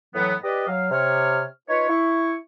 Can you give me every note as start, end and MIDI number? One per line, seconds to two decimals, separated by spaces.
0.15 0.34 45
0.15 0.34 52
0.15 0.34 54
0.15 0.34 59
0.44 0.63 67
0.44 0.63 71
0.44 0.63 74
0.44 0.63 75
0.67 0.88 54
0.67 0.88 77
0.91 1.43 48
0.91 1.43 73
0.91 1.43 89
1.69 1.88 63
1.69 1.88 65
1.69 1.88 71
1.69 1.88 73
1.89 2.35 64
1.89 2.35 85